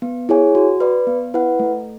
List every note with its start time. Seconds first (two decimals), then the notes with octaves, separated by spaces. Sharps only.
0.02 B3
0.29 E4 G#4 C#5 G#5
0.55 F#4
0.80 B4 D5
1.07 B3
1.34 E4 B4 F#5
1.60 A3